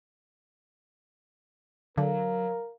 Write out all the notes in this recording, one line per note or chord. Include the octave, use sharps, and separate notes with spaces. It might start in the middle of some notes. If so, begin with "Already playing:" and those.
D3 F#3 A#4 F5